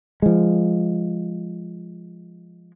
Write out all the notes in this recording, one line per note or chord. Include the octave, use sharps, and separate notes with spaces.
F3 G#3